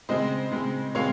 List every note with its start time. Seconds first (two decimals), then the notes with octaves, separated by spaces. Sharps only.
0.09 C#3 G#3 C4 C5 D#5
0.52 C#3 G#3 C4
0.95 C#3 G#3 C4 C#5 F5